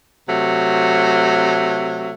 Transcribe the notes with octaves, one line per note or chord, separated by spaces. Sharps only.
C3 F#3 A3